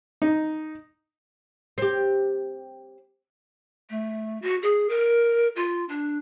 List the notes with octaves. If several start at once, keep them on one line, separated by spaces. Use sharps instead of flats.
D#4
C4 G4
A3
F#4
G#4
A#4
F4
D4